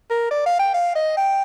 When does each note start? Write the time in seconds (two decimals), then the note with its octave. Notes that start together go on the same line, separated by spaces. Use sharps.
0.10 A#4
0.31 D5
0.46 F5
0.59 G5
0.74 F5
0.95 D#5
1.17 G5